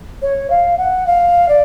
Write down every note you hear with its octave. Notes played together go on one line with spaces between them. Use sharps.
C#5
F5
F#5
F5
D5